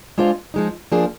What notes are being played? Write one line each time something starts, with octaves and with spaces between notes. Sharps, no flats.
G#3 D4 F4 C5 F5
F3 G#3 D#4
F3 A#3 D4 G#4